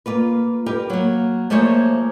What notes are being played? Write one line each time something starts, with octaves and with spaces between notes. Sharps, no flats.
A#3 F4 B4
G4 A#4 B4
F#3 A#3
F3 A3 A#3 G#4 C5 C#5